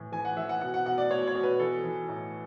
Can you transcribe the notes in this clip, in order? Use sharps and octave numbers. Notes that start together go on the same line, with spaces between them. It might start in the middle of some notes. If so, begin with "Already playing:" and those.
Already playing: A2 E3
E3 G#5
F#5
E3 E5
F#5
B2 F#5
F#5
B2 F#5
D5
B2 C#5
C#5
B2
B4
E3 A4
E3
A2